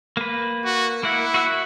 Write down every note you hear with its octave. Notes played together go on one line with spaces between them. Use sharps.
A#3 B4
F#4
A#3 E4 F#5
F#4 E5 F#5